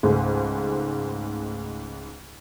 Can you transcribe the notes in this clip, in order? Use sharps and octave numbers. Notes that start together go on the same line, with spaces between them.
C#2 G#2 A3 D#4 C5